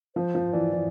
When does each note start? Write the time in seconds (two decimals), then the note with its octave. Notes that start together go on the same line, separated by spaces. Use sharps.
0.16 F3 C5
0.35 F3
0.53 E3 D5
0.73 E3